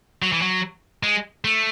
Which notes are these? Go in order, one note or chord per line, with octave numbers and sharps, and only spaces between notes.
F#3
E3
F#3
G#3
A3